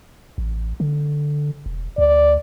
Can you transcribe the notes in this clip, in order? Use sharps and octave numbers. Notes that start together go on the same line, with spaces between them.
A1
D3
E1
D2 D5